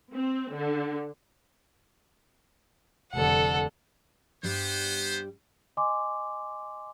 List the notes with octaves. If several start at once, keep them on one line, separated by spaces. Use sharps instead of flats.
C4
D3
F1 D3 A4 F#5
G2 G3 B3 C5
D#5 G#5 C6 D6